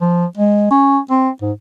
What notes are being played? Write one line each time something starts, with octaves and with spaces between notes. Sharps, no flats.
F3
G#3
C#4
C4
G#2